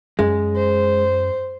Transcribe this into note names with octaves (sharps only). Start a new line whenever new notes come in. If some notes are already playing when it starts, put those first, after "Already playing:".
F#2 G#3 C#4
C5